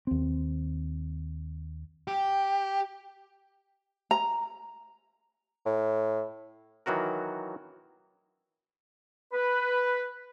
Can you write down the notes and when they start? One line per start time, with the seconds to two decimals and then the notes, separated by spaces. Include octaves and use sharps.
0.07 D#2 C4
2.07 G4
4.11 A#5
5.66 A2
6.86 D#3 E3 F#3 F#4 A#4
9.33 B4